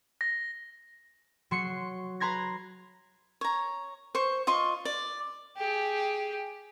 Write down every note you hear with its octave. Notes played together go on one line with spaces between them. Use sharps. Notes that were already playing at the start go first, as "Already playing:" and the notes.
A#6
F#3 C6 C#6 C7 C#7
B4 A#5 C6 G#6 A#6
C#5 A#5
C5 C#6
F4 D#5 C6 C#6
D5
G4 G#4